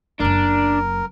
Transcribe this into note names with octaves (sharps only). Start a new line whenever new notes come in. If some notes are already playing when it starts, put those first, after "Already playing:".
F#1 F#2 D4 A#4